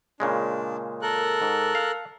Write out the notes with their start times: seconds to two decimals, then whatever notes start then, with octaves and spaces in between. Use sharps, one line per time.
0.20 A#2 C#3 G#3 D4
1.02 A4 A#4 F#6
1.42 G#2
1.75 F5